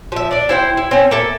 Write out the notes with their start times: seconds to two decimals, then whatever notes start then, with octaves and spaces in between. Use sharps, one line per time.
0.12 F3 E5
0.31 D4 D5
0.49 E4 C5 F#5 G5
0.77 E4
0.91 C4 C#4
1.11 A#3 A4 E5